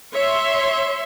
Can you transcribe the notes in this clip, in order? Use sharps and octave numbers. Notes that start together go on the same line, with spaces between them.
C#5 E5 C6